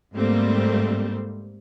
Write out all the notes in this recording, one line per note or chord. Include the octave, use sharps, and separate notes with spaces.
G#2 G3 A3 A#3 C4